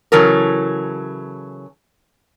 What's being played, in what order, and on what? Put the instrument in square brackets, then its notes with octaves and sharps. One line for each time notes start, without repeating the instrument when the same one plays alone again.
[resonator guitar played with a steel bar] C#3 E3 F#3 A4 A#4